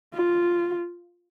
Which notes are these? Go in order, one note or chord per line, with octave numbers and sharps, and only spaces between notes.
F4